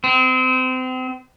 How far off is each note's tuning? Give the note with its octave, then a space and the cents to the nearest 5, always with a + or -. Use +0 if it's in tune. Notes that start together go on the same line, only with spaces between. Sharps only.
C4 -30